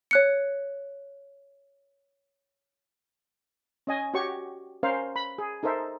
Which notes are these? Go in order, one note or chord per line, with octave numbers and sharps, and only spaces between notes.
C#5 F#6 C#7
C#4 D#5 G#5
F#4 G4 C#5 C#6
C#4 A#4 C5 F5
B5
G#4
D#4 A4 A#4 C5 E5